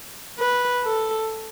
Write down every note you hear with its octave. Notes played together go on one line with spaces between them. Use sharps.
B4
A4